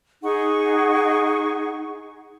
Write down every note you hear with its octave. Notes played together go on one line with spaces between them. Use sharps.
D#4 G#4 F#5 C#6